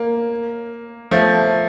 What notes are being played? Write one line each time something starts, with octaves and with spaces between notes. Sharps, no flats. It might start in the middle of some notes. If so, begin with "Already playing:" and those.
Already playing: A#3
F3 A3